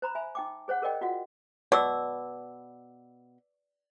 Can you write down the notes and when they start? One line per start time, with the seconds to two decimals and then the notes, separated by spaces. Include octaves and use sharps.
0.02 C5 A#5 B5
0.15 E5 G#5 B5
0.35 D#4 G5 D6
0.68 G#4 C5 C#5 F#5
0.82 G#4 A#4 C5 D5 D#5 G5
1.01 F4 F#4 F#5
1.72 B2 D5 D6 E6